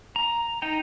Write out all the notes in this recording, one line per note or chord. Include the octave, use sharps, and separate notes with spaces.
A#5
D#4 G5 A#5